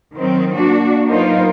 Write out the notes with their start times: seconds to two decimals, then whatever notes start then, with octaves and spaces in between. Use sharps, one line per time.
0.15 D#3 F#3 C4
0.55 A#3 D4 F#4
1.09 F#3 B3 D#4 F4 A#4 C5